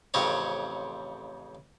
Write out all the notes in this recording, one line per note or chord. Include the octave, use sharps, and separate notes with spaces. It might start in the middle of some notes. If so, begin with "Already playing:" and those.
A1 F2 C#3 C4 C#5